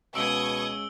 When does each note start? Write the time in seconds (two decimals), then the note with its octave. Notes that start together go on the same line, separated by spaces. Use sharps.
0.15 C#2 B2 C#6 D#6 E6 G#6 D7 G7